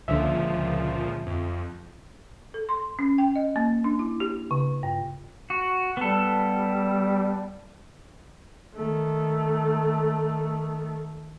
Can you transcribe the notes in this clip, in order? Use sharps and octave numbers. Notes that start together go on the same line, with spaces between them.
C#2 A#2 D3 F3 E5
F2
A4
C6
C#4
G5
D#5
A#3
D4
E4
G4
C#3
G2
F#4
G3 B3 A4
D#3 A3